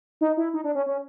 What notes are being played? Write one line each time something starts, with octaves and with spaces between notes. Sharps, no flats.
D#4
E4
D#4
D4
C#4
C#4